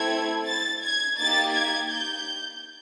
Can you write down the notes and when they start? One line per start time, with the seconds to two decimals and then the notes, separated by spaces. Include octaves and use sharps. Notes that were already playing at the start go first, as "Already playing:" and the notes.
Already playing: A3 C4 E4 A4 G#6
0.47 A6
0.83 G#6
1.18 A#3 D#4 G4 A6
1.54 G#6
1.89 G6